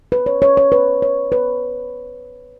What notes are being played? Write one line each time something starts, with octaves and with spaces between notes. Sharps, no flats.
B4
C#5
C#5
C#5
B4
C#5
B4